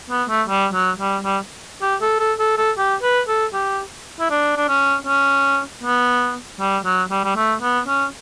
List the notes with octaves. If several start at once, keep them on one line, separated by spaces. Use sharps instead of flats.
B3
A3
G3
F#3
G3
G3
G4
A4
A4
A4
A4
G4
B4
A4
G4
E4
D4
D4
C#4
C#4
B3
G3
F#3
G3
G3
A3
B3
C#4